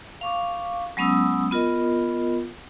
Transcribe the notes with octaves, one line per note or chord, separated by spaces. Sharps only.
F5 C#6 D6
F#3 G#3 B3 C#4 D#6 E6
B3 F4 A#4 D#5